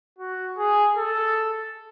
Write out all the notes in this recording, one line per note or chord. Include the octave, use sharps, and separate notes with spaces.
F#4
G#4
A4